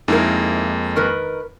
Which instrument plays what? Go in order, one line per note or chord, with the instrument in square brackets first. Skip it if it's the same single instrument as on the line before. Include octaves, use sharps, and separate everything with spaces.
[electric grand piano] F2 G#3 A#3 [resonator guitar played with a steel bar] D#4 E4 A#4
[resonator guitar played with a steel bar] D#3 A#4 B4